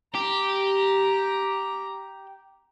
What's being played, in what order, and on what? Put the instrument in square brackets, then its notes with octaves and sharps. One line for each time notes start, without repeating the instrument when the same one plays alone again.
[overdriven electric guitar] G4 [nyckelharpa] A#5